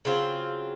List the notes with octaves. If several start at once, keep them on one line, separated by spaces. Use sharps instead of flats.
C#3 F#3 C4 F4